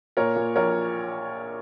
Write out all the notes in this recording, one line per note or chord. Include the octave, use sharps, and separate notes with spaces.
A#2 A#4 C#5
A#2
A#1 A#4 C#5